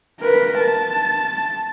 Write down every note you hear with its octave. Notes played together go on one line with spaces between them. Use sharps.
A#4 B4
A5